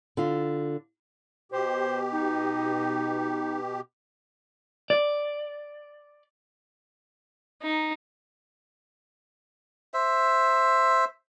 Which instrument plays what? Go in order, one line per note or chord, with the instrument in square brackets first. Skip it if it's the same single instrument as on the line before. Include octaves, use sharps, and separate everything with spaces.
[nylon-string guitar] D3 F4
[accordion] B2 G4 [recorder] C5
[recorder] D#4
[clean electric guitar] D5
[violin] D#4
[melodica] C5 E5